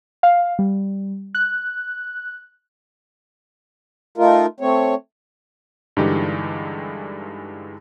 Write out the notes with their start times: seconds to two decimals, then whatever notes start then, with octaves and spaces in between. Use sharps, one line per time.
0.23 F5
0.59 G3
1.35 F#6
4.18 A3 D#4 F4 A#4
4.60 A3 C4 C#5
5.97 G2 D3 E3 G#3 D#4 G4